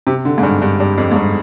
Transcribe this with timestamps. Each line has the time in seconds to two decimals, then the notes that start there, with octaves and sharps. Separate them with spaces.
0.07 C3
0.25 D3
0.38 G#2
0.43 G2
0.62 G2
0.80 G2
0.98 F2
1.12 G#2
1.16 G2